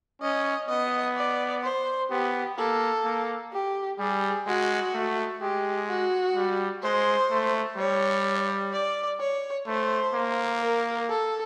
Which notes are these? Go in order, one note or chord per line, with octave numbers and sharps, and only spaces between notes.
C#4 D#5
B3 D#5
D5
C5
B3 G4
A#3 A4
A#3
G4
G3 G#4
G#3 F#4
A3
G#3 G4
F#4
G3
G#3 C5
A3
G3 C#5
D5
C#5
A3 C5
A#3
A#4
A4